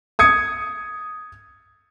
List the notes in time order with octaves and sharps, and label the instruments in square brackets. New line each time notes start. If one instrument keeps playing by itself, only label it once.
[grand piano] D#6 G#6 C#7